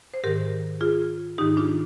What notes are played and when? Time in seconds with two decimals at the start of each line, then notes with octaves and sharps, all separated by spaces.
0.14 C5
0.24 G#2 D#3 G4 A#4
0.81 F4 G#4
1.38 G#2 D#3 D#4 G4
1.57 D4 F4